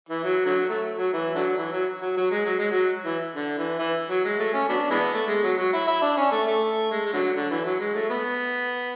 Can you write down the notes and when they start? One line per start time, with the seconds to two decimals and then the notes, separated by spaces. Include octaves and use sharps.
0.09 E3
0.24 F#3
0.46 D3 F#3
0.69 A3
0.98 F#3
1.13 E3
1.35 D3 F#3
1.57 E3
1.72 F#3
2.01 F#3
2.17 F#3
2.31 G#3
2.46 F#3
2.59 G#3
2.71 F#3
3.05 E3
3.35 D3
3.58 E3
3.79 E3
4.09 F#3
4.25 G#3
4.39 A3
4.54 C#4
4.69 F#3 B3 D4
4.90 E3 G#3 B3
5.14 A3
5.27 G#3
5.43 F#3
5.58 F#3
5.73 E4
5.87 E4
6.02 D4
6.17 C#4
6.32 A3
6.46 A3
6.91 G#3
7.05 G#3
7.13 D3 F#3
7.35 D3
7.50 E3
7.65 F#3
7.79 G#3
7.94 A3
8.10 B3